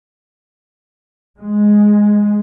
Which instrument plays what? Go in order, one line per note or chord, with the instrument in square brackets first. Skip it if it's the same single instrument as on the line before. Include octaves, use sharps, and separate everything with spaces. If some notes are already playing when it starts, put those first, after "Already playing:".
[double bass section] G#3